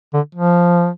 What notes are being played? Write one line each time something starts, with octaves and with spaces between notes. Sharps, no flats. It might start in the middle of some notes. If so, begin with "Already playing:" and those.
D3
F3